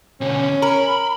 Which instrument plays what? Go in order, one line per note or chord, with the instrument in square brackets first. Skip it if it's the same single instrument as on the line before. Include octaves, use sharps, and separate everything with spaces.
[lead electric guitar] B2 D3 [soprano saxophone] C#4
[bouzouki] A#4 [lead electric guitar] B5